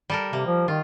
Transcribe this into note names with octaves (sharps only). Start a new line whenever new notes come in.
G3 A4 A#4
C3 A#3
F3
D#3 F4